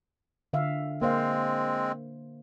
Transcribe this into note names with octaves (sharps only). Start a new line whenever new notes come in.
D3 E5 F5
G#3 A#3 C4 C5 F5